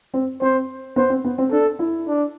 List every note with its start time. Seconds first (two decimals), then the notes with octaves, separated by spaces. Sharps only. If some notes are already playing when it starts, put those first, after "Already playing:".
0.14 C4
0.42 C4 C5
0.96 B3 C5
1.10 C4
1.25 B3
1.38 C4
1.51 D4 A4
1.79 E4
2.07 D4